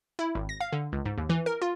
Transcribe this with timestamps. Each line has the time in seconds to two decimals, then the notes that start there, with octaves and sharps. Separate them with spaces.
0.19 E4
0.35 G#1
0.49 A#6
0.60 F5
0.72 D3
0.92 C#2
1.05 G#2
1.18 D#2
1.29 E3
1.46 A#4
1.62 F4